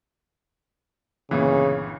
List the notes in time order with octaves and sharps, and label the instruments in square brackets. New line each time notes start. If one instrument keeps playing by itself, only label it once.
[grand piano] G1 A#2 E3 [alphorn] C#3